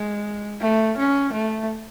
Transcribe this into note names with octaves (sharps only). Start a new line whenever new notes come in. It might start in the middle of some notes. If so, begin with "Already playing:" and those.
Already playing: G#3
A3
C#4
A3